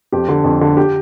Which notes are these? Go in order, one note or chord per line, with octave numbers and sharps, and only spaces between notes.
F2 G4
D3
F2
D3
G4